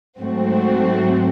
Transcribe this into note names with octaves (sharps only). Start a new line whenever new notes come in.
G#2 F#3 A3 C4 F#4